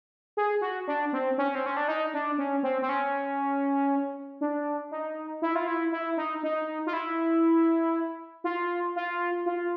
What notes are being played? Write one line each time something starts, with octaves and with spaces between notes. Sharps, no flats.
G#4
F#4
D4
C4
C#4
C4
C#4
D4
D#4
D4
C#4
C4
C4
C#4
D4
D#4
E4
F4
E4
E4
D#4
D#4
F4
E4
F4
F4
F4